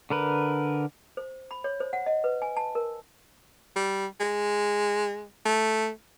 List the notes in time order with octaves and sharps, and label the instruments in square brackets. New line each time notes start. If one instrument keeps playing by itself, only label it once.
[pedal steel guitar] D3 A#4 B4
[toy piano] C5
B5
C#5
C5
F#5
D#5
B4
G#5
A5
A#4
[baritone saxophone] G3
G#3
A3